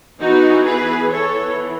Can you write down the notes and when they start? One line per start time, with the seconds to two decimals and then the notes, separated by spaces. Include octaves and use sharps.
0.20 E3 B3 D#4 F#4
0.66 G#4 B4
1.12 E3 B3 A4 C#5